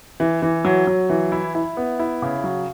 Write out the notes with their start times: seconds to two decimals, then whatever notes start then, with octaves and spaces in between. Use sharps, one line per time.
0.20 E3
0.42 E3
0.65 F#3
0.87 F#3
1.09 E3
1.32 E4
1.55 E4
1.77 B3
1.99 E4
2.22 C#3
2.44 F#3